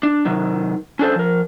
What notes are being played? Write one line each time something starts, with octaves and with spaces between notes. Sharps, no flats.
D4
C3 D#3 F#3
C#4 D4 A4 C5
F3 A#4